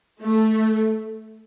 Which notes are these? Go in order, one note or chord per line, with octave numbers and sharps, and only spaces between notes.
A3